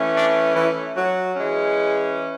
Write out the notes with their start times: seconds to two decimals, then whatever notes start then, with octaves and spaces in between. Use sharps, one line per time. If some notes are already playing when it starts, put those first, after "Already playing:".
Already playing: E3 A3 C#4
0.15 D4
0.54 E3 E4
0.94 F#3 F#4
1.35 E3 G#3 C#4